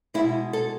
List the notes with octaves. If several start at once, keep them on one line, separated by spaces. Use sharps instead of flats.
B2 G#3 E4
A4